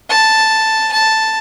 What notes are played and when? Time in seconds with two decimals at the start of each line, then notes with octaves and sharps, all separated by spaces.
0.09 A5
0.92 A5